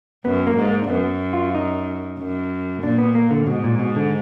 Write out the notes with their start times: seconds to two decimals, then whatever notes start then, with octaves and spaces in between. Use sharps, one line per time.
0.25 F#2 B3
0.47 A#3
0.58 G#2
0.69 A#3
0.82 D4
0.90 F#2 B3
1.33 F4
1.55 D#4
2.18 F#2
2.83 A#2 D4
2.98 B3
3.15 A#3
3.31 D3
3.47 G#2 B2
3.64 A#2
3.79 B2
3.96 D3